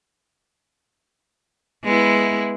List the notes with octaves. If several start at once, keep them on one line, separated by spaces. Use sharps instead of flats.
G#3 B3 E4